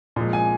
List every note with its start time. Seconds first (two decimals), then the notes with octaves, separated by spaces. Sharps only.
0.16 A#2 F3 G#3
0.33 G#5